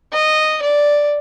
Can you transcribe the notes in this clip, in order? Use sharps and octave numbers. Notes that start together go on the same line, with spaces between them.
D#5
D5